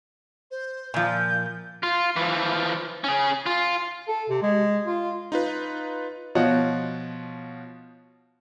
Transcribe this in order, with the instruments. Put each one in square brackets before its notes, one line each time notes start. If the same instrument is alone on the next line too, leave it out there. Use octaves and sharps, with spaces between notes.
[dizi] C5
[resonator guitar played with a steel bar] A#2 F3 [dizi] G6
[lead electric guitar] F4
E3 F3
C#4 G#4
F4
[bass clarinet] A4
C3
G#3
F4
[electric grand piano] D#4 F4 B4
[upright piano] B2 F3 F4 F#4 C#5 D#5